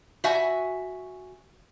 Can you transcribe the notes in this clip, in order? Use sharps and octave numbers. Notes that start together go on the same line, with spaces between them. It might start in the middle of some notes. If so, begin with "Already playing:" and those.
F#4 E5 G#5